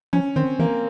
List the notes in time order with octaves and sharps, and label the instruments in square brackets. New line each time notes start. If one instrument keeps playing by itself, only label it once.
[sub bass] F3 [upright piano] C#4
[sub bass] D#3 [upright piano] C4
[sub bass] E3 [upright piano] A#3